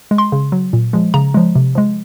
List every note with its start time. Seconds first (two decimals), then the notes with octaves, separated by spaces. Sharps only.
0.11 G#3
0.18 C6
0.32 C#3
0.52 F#3
0.73 A#2
0.93 F3 G#3
1.14 C#3 A#5
1.34 F3 G#3
1.55 C3
1.75 F3 G#3